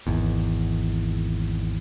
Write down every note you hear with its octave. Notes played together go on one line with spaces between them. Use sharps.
G#1 E2